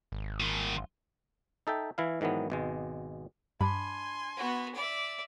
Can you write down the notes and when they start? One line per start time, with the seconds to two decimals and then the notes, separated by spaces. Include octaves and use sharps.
0.12 G#1
0.40 A#2 D#3
1.67 D#4 A4 E5 G5
1.98 E3 E4 F5
2.21 G#2 D#3 E3 F#3 B3
2.50 G#1 B2 G#3
3.61 G2 D4 G#5 B5 C6
4.37 B3 F#4
4.75 D5 E5